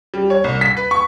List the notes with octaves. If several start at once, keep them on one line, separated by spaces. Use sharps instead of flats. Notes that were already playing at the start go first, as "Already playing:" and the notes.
G3
C#5
C2
B6
B4
C#6